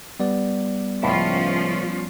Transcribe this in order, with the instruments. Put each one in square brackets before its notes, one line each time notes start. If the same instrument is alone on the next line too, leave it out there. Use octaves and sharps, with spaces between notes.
[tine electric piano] G3 B3 D5
[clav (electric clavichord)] C#2 A2 A5 [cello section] F3 C#4 F4